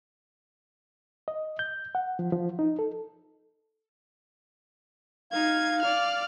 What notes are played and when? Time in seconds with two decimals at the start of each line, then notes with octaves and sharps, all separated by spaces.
1.28 D#5
1.59 G6
1.95 F#5
2.19 F3
2.32 F3
2.59 D#4
2.79 A4
5.32 D#4 F5 G#6
5.82 D5 F6